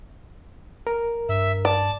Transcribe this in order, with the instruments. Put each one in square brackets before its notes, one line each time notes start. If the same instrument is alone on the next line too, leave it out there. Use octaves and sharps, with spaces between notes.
[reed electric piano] A#4
[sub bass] G2 [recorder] E5
[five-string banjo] D5 [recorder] A5